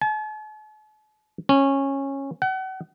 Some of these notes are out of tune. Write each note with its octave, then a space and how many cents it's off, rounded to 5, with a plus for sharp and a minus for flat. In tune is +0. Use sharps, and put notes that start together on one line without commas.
A5 -45
C#4 -15
F#5 +35